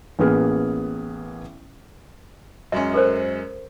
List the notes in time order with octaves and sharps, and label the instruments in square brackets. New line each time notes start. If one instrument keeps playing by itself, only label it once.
[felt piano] A1 A#3 B3 G#4 F6
[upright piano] F#2 G#3 C#4 [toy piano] E5
[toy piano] A4 A#4 C5